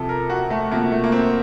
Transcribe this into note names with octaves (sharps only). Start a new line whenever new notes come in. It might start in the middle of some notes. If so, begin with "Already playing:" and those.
Already playing: C3 F3 A4
A#4
F#4
A3
C3 F3 A#3
A3
A#3
C4